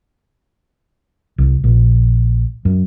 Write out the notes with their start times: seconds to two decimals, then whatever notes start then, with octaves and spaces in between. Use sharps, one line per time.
1.38 C2
1.64 A#1
2.65 F#2